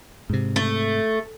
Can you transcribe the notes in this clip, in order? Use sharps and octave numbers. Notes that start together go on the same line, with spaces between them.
G#2 C3
A3